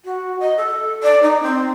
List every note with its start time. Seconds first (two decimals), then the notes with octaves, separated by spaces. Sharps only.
0.05 F#4
0.40 D#5
0.58 A4
1.03 D5
1.23 D#4
1.43 C4